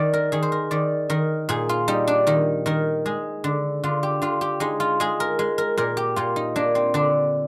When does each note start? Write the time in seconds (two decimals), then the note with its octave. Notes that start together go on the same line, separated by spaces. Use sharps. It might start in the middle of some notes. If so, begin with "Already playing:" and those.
Already playing: D#3 D5
0.13 A#4
0.32 D#3 G#4
0.42 C5
0.52 A#4
0.71 D#3 D5
1.10 D#3 A#4
1.49 A#2 G#4
1.69 F4
1.88 G3 D#4
2.07 D4
2.27 D#3 D#4
2.66 D#3 A#4
3.06 G#3 G#4
3.44 D3
3.83 D3 F4
4.03 G4
4.22 D3 F4
4.41 G4
4.60 G#3 D#4
4.80 F4
5.00 G#3 G#4
5.20 A#4
5.39 G#3
5.58 A#4
5.77 A#2 A#4
5.97 G4
6.16 A#2 F4
6.36 D#4
6.56 A#3 D4
6.75 C4
6.94 D3 D4